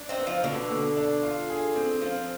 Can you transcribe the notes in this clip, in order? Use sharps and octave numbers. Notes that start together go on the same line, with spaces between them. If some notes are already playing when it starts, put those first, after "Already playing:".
Already playing: D4
C4 D#4
B3
F3
B2 D3
B2
D4
F4
G#4
C4
F3 C4